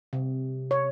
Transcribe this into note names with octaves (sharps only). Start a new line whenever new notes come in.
C3
C#5